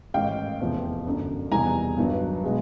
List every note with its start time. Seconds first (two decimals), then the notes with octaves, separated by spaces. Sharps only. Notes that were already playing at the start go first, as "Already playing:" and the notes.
0.14 A1 G#2 D#3 F5 G5
0.60 F1 E2 C3 F3
1.06 G1 F#2 D3
1.51 E1 E2 C3 D#3 G3 G#5 A#5
1.98 G2 D#3 F#3 B3
2.44 B2 G#3 B3